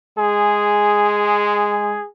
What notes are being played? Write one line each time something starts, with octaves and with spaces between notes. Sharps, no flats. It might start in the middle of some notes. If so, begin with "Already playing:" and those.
G#3 G#4